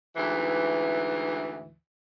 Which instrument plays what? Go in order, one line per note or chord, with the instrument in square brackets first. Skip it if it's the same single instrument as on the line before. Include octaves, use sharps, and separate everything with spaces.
[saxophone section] D2 G#2 E3